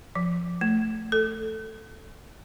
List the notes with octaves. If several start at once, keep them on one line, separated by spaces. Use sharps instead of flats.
F3
A3
A4